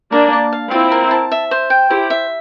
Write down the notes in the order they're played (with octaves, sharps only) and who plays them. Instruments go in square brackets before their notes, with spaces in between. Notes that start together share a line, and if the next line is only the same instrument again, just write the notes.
[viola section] A#3 D4 [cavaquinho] A#4
[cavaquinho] A5
F5
[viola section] C4 E4 [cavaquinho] F4
[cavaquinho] A#4
A5
E5
C5
G5
[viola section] E4 G4 [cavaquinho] C5
[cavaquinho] E5